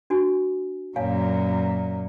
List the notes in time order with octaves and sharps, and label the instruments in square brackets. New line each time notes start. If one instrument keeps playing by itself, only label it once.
[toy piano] D4 F#4 G#5
[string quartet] F#2 A#2 [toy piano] C#5 F5 G#5